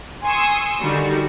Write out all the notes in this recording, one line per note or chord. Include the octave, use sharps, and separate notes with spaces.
G#5 C6 C#6 D#6 E6
D3 D#3 G3 F#4